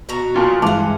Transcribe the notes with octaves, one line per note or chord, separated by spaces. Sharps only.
B2 F#4 A#5
A#2 F4 A5
G2 E3 G#3 F5 F#5 A5 D6